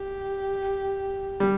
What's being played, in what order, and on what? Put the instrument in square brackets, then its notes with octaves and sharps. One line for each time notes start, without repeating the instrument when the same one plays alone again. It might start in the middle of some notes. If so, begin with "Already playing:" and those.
Already playing: [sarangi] G4
[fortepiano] G3